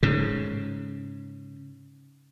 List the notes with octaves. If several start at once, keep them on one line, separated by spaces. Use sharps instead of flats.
G#2 C#3